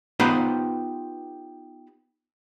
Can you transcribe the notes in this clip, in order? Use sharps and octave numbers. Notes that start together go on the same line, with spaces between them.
B3 D#4 F4 G4 B4 C5